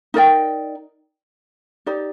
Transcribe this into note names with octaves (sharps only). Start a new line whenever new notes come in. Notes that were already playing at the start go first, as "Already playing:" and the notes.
D#4 A#4 D5 G5
D#4 G4 D5